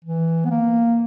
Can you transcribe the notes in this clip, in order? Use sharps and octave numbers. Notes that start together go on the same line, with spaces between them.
E3
B3
A#3